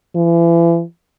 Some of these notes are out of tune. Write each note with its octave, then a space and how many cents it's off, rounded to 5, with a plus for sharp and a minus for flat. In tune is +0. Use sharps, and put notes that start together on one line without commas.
E3 +40